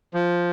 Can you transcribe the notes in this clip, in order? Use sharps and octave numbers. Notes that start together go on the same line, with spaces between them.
F3